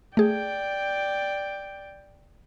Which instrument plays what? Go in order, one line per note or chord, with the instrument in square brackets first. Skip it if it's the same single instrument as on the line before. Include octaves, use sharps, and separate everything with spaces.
[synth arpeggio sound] A3 G#4 [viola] D5 G5